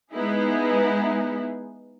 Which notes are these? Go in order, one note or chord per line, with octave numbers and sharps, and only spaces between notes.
G#3 B3 D#4 E4 G#4